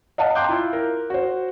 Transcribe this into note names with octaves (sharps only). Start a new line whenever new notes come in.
D#5 F5 F#5 A5
G5 A#5 C6 D6 F#6 G6
E4 F4
A#4
F#4 C5